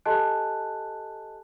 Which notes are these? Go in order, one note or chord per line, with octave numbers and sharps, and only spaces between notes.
G4 A4 D#5 G#5 A5 F#6